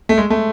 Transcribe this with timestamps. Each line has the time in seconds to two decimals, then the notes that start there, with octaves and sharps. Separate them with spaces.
0.09 A3
0.18 G#3
0.30 A3